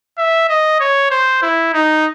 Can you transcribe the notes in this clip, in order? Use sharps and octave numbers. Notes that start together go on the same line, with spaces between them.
E5
D#5
C#5
C5
E4
D#4